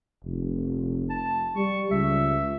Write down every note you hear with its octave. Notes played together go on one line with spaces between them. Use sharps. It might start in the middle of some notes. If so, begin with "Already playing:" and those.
F1
A5
G3 C#6
C#2 E5